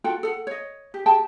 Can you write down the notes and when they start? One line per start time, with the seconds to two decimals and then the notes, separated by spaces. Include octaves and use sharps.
0.04 F4 F#4 A4 G5
0.23 A4 F#5
0.47 C#5 D#5
0.94 G4
1.06 G4 G#4 G5 A5